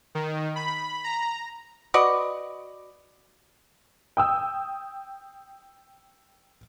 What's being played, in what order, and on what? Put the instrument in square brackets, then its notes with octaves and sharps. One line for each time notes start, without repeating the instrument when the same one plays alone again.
[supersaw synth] D#3
B5
A#5
[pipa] F#4 B4 D5 D#5
[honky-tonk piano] G5 D#6 E6